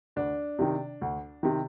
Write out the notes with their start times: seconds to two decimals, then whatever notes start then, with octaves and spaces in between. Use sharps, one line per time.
0.16 D2 D4
0.59 C3 D#3
1.01 D2
1.43 C3 D#3